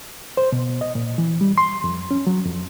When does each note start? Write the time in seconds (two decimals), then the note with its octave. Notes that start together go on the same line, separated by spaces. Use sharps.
0.37 C5
0.52 B2
0.81 D#5
0.95 A#2
1.18 E3
1.41 G3
1.58 C6
1.84 F2
2.11 C#4
2.27 F#3
2.46 F2